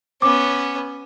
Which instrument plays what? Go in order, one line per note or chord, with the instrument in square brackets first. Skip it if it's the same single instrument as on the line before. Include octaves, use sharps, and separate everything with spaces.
[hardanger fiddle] B3 C#4 [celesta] D6